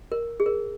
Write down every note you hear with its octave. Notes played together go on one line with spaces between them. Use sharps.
A#4
G#4
A#4